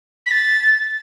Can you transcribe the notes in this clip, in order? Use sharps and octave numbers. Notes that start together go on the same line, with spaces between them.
B6
A6